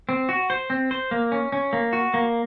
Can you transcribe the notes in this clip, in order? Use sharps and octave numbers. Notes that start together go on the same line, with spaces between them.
C4
F#4
C5
C4
C5
A#3
C#4
C#4
A#3
F#4
A#3